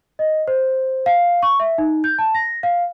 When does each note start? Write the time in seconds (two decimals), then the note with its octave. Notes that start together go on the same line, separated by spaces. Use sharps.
0.19 D#5
0.48 C5
1.06 F5
1.43 C#6
1.60 E5
1.78 D#4
2.04 G6
2.18 A5
2.35 A#6
2.63 F5